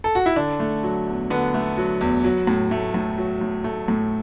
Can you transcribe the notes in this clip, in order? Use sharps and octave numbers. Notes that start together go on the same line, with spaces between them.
A4
F#4
E4
D3 D4
A3
F#3
E2
D3 B3
A3
F#3
E2
F#3
A2
A3
A2
F#3
A2
A3
A2